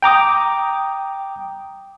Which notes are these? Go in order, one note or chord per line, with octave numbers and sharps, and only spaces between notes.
G5 A#5 D6 D#6